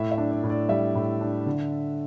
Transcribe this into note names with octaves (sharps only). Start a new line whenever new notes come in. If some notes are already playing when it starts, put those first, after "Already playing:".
Already playing: A2 E5
E5
D4
D5
A2
D5
G3 E5
A2
D4
D3